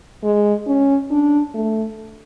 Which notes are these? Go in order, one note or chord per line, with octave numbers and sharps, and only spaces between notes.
G#3
C#4
D4
A3